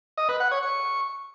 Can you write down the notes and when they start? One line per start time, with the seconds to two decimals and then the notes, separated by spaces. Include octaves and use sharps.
0.18 D#5
0.29 B4
0.40 F#5
0.51 C#5
0.63 C#6